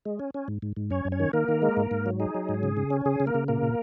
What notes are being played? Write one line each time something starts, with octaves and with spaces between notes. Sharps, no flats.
G#3
C#4
C#4
G#2
G#2
G#2
F#2 C#4 C#5
F#2
C#4 C#5
D#3
D#3 A#3 A#4
D#3
G#3
G#2
G#2
F#3
D#4 G#4
F#3
G#2
C#3
C#3
C#4
C#3 G#4
C#3
A#3 A#4
C#3
A#2 A#3 A#4
A#2